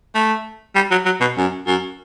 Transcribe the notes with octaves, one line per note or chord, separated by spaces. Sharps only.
A3
G3
F#3
F#3
B2
F#2
F#2